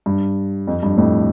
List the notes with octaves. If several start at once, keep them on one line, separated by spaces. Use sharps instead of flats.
G2
F2
G2
F2 A2